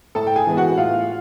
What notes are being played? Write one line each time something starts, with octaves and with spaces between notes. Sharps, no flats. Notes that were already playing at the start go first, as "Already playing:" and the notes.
A2 A4 A5
G5
G#4 G#5
E3 G#3 B3
F#4 F#5
A2 F4 F5